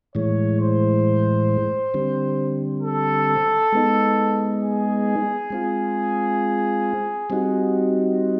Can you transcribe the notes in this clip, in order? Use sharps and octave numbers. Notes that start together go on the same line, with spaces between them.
A2 E3 G#3 C#5
C5
D3 G3 C4
A4
G#3 B3 D#4
G#4
G#3 C4 F4
G3 C4 D#4 F#4